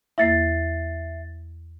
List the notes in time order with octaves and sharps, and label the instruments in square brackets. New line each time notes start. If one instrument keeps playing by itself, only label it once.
[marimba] E2 A#3 E4 [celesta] E5 A6 C7